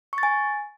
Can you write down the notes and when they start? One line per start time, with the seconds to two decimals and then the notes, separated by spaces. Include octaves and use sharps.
0.13 C#6
0.18 A6
0.23 G#5